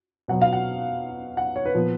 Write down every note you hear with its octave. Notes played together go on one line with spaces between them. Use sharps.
B2 F#3 B3 F#5
F5
F#5
F#5
C#5
B4
A#2 F3 B3